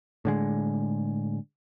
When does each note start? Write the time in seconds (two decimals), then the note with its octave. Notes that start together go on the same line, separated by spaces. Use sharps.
0.25 A2 D3 G#3